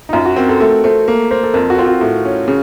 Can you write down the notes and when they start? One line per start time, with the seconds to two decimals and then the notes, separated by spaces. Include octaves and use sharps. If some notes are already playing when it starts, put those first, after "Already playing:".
0.09 D#4
0.13 F#2 F4
0.26 F#4
0.36 C4 A#4
0.49 A4
0.60 A3 A#4
0.84 A3 C5
1.08 A#3
1.31 A#3 C5
1.43 A4
1.54 F2 A#4
1.70 F#4
1.78 C4 F4
1.86 F#4
2.01 A2
2.25 C#4
2.48 C#3